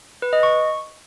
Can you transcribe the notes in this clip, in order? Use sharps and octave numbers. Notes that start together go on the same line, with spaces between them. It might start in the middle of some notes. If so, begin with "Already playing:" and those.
B4
D#5
C#6